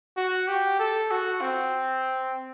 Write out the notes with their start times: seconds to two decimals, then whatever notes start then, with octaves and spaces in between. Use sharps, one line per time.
0.17 F#4
0.48 G4
0.79 A4
1.11 F#4
1.41 C4